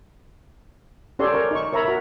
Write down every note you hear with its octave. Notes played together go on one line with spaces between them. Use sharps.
C#4 G4 A4 C#5 D5 C6
A#4 C#5
D#4 C#6
A#4 C#5 E5 A#5 B5
F#4 A#4